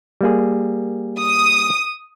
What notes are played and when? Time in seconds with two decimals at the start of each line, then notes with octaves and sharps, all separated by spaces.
0.21 G3 A#3 G#4
1.19 D#6